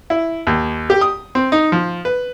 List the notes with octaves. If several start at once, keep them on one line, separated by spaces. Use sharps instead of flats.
E4
D#2
G4
D#6
C4
D#4
F3
B4